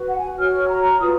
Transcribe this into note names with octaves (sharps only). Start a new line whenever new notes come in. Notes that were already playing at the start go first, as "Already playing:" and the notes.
Already playing: F#4 B4
F#5
G#5
F#4 C#5 F6
A#5
F4 B4 D#6